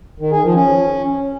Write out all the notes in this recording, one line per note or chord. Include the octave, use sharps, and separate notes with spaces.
D#3
G#4
F3
C#4